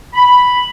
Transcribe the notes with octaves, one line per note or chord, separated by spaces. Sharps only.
B5